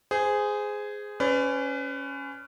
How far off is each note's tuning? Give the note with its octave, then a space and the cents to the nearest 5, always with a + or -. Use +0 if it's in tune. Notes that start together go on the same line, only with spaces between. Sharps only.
G#4 +0 C5 -25
C#4 +5 B4 +35 D5 +0